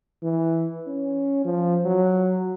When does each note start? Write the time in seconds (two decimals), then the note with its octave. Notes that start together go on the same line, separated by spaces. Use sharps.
0.23 E3
0.87 C#4
1.45 F3
1.85 F#3